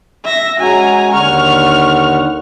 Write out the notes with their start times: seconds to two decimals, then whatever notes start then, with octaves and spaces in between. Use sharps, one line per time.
0.24 E5 A#6
0.60 G#3 C#4 F#4 G#5 A#5
1.12 D#2 D3 F#5 C#6 F6